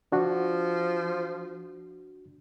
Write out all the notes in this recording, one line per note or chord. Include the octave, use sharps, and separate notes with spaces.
F3 D4 F#4